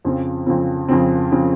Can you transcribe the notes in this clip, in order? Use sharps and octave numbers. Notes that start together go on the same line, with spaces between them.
F2 C#3 F3 C4
F2 C#3 F3 C4
F2 C#3 F3 C4
C#3 F3 C4